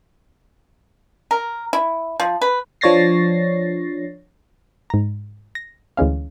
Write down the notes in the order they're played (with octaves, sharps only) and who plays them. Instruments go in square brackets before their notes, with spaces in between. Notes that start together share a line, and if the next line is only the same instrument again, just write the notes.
[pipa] A#4
E4
F3
B4
[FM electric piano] F3 D4 C#5 A6 A#6 C7
[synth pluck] G#2 A#5
A#6
D2 E3 G#3 C#4 F5